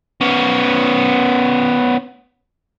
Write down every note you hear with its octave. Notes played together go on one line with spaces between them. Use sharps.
B3 C#4